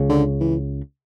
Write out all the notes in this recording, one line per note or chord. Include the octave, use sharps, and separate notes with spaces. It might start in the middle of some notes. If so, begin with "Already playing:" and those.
Already playing: C#2 C#3
D3
E3